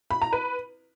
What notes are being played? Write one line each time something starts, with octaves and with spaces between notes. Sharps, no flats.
B5
A#5
B4